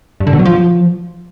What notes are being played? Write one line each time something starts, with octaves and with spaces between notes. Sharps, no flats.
G2
D3
B2
F#3
F3